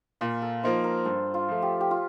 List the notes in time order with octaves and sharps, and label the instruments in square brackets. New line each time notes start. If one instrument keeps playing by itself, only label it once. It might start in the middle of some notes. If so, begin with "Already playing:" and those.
[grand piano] A#2 [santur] F4
[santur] A4
[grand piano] F3 A#3 D#4 [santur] C5
[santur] A#4
[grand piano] G2 [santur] A4
[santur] F4
[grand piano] F3 A3
[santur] G4
G4
F4